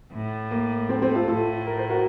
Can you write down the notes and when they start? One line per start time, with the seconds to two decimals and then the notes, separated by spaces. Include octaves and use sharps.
0.12 A2
0.51 A#3
0.89 A3 C4
1.02 A3 C4
1.15 F4 A4
1.28 A2 F4 A4
1.67 A#4
1.78 C5
1.89 F#4 A#4